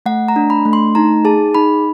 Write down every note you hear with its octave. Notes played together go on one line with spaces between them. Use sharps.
A3 F#5
A#5
D4
B5
A3
C6
D#4 A#5
G#4 A5
D#4 B5